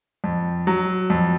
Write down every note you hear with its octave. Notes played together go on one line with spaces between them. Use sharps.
F2
F#3
F2